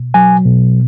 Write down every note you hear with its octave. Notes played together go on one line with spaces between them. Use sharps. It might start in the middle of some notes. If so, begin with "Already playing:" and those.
Already playing: B2
F#3 G#5
B2